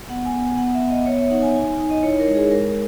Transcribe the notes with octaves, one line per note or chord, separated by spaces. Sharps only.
B3 F#5
G#5
B3
G#5
B3 F#5
E5
B3
D#5
B3 C#5
E5
D#4 F#5
G#5
D#4 G#5
D#4
D#5
E4 C#5
A#4
G#3
G#4
G#3 A#4